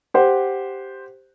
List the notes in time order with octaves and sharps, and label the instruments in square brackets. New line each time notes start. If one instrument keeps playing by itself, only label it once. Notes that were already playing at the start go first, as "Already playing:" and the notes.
[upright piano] G4 C5 F#5